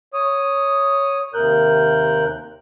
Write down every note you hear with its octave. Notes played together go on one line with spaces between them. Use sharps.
C#5 D#6
D#2 C3 A#4 F#6 G6